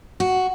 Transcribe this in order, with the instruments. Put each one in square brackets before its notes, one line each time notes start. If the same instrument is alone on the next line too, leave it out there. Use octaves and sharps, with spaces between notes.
[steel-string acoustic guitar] F#4